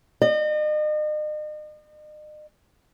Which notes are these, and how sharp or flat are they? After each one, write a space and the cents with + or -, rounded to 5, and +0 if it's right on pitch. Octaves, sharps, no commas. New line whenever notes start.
D#5 -40